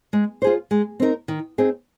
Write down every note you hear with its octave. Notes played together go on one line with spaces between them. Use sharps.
G#3
F4 G#4 C5
G#3
C4 D#4 A#4
D#3
C4 D#4 G#4